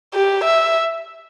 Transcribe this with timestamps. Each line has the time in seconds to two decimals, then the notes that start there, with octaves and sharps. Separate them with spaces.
0.14 G4
0.44 E5